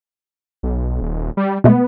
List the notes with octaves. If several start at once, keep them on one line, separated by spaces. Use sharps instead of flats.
B1
D#1
G3
B2 G#3 A3 B3